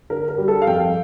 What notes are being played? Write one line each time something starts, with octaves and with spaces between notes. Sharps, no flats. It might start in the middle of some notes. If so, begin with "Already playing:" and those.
D3 A#4
A#4
G3
A4
F5
F2 G5